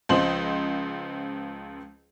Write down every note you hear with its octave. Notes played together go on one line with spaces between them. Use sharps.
C#2 F3 C5 D#5 C6 F#7